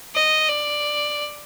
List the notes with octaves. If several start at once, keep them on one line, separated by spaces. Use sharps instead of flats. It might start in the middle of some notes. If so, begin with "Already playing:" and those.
D#5
D5